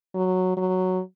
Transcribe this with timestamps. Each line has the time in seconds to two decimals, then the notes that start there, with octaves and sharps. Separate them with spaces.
0.15 F#3
0.57 F#3